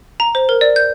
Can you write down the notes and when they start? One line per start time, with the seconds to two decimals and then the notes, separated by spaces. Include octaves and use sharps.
0.20 A#5
0.35 C5
0.49 A#4
0.61 D5
0.76 G6